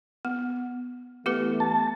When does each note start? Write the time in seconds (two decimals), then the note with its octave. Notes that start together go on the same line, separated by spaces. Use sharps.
0.25 B3
1.26 E3 A3 B3 G4 B4
1.60 A5